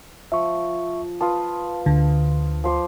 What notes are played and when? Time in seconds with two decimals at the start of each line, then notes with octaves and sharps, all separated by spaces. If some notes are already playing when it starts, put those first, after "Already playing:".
0.32 F3 E5 C#6
1.21 F4 B4 A5 D#6
1.86 D2 D3
2.64 F3 C5 D6